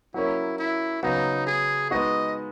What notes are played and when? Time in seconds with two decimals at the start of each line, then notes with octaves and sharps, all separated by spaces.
0.14 F#3 A#3 C#4 E4
0.58 E4
1.03 C#3 F#3 B3 D#4
1.47 G#4
1.91 G#3 B3 D#4 F#4 D#5